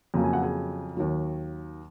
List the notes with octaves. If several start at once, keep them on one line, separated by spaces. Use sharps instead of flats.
F2 C#3 F#3 A#3 A#5
G#5
F#5
G#4 G#5
D#2 D#3 F#3